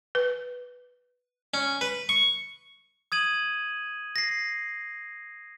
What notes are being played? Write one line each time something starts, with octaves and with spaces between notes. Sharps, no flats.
B4
C#4
B4
C#6
D#6 G#6 D#7 F#7
A#6 C7